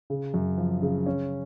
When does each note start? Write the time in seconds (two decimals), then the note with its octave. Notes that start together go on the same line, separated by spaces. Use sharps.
0.10 C#3
0.34 F#2
0.58 F3
0.82 C#3
1.06 C#4